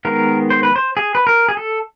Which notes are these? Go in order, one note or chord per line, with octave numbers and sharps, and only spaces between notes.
D#3 G#3 B3 A#4
C5
B4
C5
G#4
B4
A#4
G#4
A4